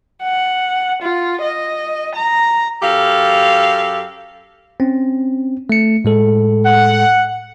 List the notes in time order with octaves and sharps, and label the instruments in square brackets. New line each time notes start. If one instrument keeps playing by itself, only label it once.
[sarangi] F#5
F4
D#5
A#5
[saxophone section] F#2 G4 A4 F5
[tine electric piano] C4 C#4
A3 C#7
A2 G#3 A4
[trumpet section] F#5